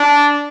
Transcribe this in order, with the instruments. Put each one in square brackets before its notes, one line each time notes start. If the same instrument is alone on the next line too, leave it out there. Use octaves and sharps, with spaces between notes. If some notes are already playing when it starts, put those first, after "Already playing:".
Already playing: [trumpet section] D4